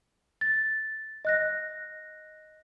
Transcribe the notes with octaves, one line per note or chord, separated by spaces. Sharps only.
A6
D#5 F#6 A#6